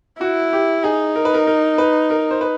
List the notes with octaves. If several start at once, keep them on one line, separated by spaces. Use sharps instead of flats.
E4 F#4
G4
D#4 G#4
A#4
B4
A#4
A#4
B4
A#4
C5
B4